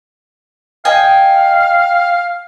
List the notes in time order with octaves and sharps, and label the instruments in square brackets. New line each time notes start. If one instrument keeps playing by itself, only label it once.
[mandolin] D#5 G5 G#5 [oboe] F5